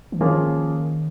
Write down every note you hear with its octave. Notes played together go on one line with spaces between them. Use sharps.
E3
D#3 F3 A#3 C#4 F4 G#4